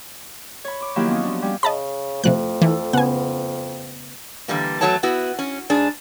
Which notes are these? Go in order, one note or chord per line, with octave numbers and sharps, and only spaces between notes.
C#5 B5
C#6 D6
D#3 F3 F#3 A#3 E4 G4
B3 C#4 C#6 D#6
F3 D4
G3 C#4 G4
C#3 D#5 A5 B5
F2 C3 F3 A3 F#6
E3 A4
C#3 B3 F#5 G#5
D3 E3 G3 A#3
E2 E3 F#3 A3 C#5 A5
B3 E4 F#4
C#4
G#2 D4 G#4